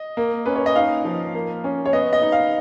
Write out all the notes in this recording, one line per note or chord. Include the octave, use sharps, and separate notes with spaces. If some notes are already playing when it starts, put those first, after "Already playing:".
Already playing: D#5
A#3
C#4 B4
C#5
D#5
D#4 F5
F3
A#3
C#4
C#5
B3 D#5
D#5
D#4
F5